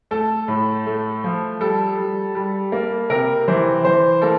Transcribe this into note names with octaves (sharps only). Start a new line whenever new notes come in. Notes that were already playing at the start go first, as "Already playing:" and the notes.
A3 A4
A2
A3
F3
G3 A4
G3
G3
A#3
C3 A#4
E3 C5
E3 C5
A#3 A4